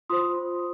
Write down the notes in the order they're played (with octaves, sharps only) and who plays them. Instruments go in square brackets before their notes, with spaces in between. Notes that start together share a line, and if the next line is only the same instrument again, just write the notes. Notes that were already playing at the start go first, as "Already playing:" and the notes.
[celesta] F4 C5 C6 D#6